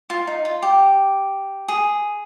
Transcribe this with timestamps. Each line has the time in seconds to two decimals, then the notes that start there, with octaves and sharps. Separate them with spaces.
0.10 F4
0.27 D#4
0.45 F4
0.62 G4
1.68 G#4